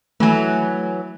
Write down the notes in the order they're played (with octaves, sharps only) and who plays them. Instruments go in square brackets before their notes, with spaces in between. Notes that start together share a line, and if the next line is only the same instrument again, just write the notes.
[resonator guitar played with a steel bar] E3 F#3 [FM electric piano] A3 G#5